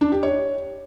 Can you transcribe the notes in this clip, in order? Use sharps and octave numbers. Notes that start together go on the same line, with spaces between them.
D4
G4
C#5